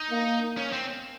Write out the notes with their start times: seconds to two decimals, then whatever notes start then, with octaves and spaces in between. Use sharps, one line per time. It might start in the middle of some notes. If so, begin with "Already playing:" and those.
Already playing: D#4
0.11 A#3
0.57 C#4
0.73 C4